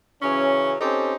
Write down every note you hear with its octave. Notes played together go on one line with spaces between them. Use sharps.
C#3 E3 F#3 C#4
C4 C#4 D#4 G4 A4 C5